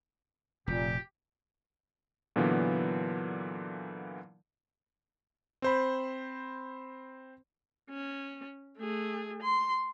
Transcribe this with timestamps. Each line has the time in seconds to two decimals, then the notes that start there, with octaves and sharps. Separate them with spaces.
0.67 F1 A#2 G4
2.36 A#2 D3 E3 F#3 A#3 B3
5.62 C4 C5 B5
7.89 C#4
8.78 A3 G#4
9.42 C6